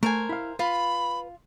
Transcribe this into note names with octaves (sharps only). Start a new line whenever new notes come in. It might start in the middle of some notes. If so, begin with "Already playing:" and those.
A3 A#4 C5 G#5
E4 F5
F4 B4 B5